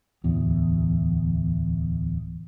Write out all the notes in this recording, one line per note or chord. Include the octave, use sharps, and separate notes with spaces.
D1 E2